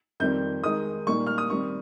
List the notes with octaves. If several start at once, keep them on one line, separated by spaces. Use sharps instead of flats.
F2 D#3 G3 C4 G6
D#3 G#3 D#4 D#6
A#2 G3 A#3 D#4 C#6
F6
D#6
D#3 G3 C4 C#6